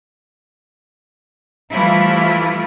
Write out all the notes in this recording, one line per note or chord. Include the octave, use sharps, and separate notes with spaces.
E3 F3 G3 A3 E4 F4